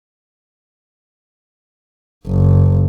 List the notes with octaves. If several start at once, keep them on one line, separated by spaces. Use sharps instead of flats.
F#1